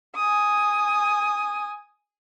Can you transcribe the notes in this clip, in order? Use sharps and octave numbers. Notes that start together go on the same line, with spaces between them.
G#5 D#6